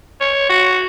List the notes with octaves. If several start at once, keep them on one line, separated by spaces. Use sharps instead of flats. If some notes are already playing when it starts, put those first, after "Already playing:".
C#5
F#4